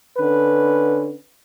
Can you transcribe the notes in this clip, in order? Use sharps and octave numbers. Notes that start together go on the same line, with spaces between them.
D3 C#4 B4